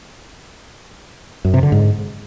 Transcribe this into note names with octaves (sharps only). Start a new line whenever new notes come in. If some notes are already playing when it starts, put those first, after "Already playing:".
F#2
C3
D3
G#2